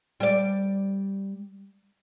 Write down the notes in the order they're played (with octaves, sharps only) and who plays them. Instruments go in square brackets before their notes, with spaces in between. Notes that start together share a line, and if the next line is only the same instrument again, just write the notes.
[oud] G3 D5